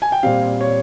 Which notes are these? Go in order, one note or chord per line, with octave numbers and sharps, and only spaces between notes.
G#5
G5
A#2 G3 C4 F5
C#5